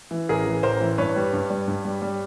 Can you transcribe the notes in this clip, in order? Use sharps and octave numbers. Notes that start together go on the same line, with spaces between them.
E3
A1 G#4 A#4
E3
A1 A#4 C5
E3
G2 B4 C#5
G3
G2
G3
G2
G3
G3